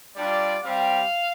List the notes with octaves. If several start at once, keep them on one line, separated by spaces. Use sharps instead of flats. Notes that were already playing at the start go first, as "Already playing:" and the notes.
G3 D4 F4 D5
G3 C4 G4 F5